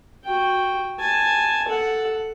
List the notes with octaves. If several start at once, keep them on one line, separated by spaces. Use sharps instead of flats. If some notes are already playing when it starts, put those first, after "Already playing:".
F#4 G5
G#5 A5
A4 F#5